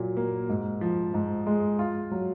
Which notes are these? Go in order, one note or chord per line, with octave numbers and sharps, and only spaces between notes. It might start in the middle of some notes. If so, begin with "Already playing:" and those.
Already playing: A#2 F#3
A#3
G#2
F3
G#2
G#3
F4
F#3